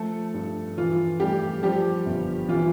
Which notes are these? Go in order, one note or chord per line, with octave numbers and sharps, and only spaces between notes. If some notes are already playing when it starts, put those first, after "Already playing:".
Already playing: F3 A3 A4
G2
E3 F4
G3 A3 G4
F3 G3 G4
G1
E3 F4